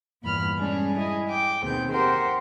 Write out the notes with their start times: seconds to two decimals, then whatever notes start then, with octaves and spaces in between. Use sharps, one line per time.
0.21 E2 G2 A#2 B5 F6
0.57 G3 G#3 C#4 D4 G#4
0.96 E4 G#4 D#5
1.28 G5 D6
1.62 D#2 B2 D#3 C4 G#4 G6
1.91 G4 A#4 C5 F#5 C6